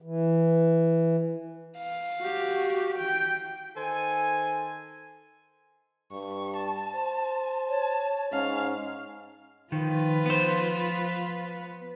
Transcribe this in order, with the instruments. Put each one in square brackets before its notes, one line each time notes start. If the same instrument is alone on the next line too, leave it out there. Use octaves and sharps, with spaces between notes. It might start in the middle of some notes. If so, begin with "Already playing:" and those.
[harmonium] E3
[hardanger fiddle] F5
[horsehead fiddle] F#4 G4
G5
[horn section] D#3 A4 C5 G#5
[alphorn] G2 [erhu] C#6
[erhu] A5
[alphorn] C5
[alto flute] C#5 [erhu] A5
[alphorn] G#2 [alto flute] C#4 [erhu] F5
[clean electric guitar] D#3 [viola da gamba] F3 F4 B4
[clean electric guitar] B3 C5